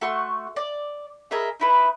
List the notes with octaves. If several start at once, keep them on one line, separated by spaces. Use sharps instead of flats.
A3 F#4 C6 C#6
D5
G#4 A#4 D#5 E5
D#4 E4 B4